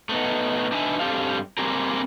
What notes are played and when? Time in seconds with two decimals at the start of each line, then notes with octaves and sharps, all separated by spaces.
0.09 A3 B3 D#4
0.72 D4 D#4 B4 E5 G#5
1.00 G2 G3 C4 G4 A4 F5
1.58 G3 A#3 C4 G4 G#4 A#4